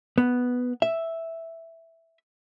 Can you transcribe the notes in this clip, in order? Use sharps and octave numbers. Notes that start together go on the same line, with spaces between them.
B3
E5